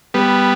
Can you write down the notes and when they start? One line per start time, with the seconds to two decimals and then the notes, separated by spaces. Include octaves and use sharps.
0.14 G3 B3